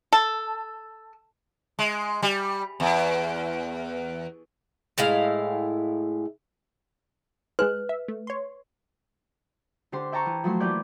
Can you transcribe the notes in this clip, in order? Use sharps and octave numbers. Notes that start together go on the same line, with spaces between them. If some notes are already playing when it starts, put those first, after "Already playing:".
A4
G#3
G3
E2
A2 G#3 E4 F5
G#3 G#4 B4 F#6
E5
A3
C#5 C6
D3 G4 C5 C6
E5 G5 A5 A#5 C#6
E3
F3 F#3 A3 C6
E3 A#3 G4 D5 G6